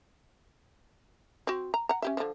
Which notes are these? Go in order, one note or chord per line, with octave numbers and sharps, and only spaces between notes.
C4 F#4
A#5
F#5 A#5
C#4 G4 E5
D3 F3